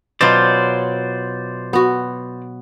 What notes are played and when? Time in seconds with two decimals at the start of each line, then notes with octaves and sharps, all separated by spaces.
0.21 B2 F#3 F4 C5 D5
1.73 B3 F#4